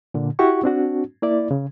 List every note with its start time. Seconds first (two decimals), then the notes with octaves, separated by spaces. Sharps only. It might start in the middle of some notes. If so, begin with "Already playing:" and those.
0.14 A#2 D3
0.39 E4 F#4 G4 F#5 C#6
0.63 C4 D4 F#4
1.22 A#3 E4 D5
1.51 C#3